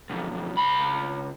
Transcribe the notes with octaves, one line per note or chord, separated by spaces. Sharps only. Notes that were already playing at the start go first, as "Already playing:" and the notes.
B1 F2
C#2 B5